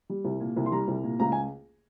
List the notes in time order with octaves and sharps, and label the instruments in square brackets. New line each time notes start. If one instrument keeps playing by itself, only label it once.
[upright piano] G3
C2
A#2
C2
C6
G3 A#5
C2
A#2
C#2 A#5
G#5